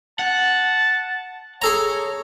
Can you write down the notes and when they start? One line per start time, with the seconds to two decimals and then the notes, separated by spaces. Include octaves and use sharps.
0.19 F#5 A5
1.62 G#4 A4 C#5 A#5